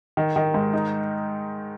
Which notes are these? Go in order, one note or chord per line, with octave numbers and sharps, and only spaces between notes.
D#3
D#3
G#2
D#4